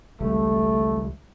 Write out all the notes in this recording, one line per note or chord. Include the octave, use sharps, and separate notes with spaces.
G#1 C#2 G3 A3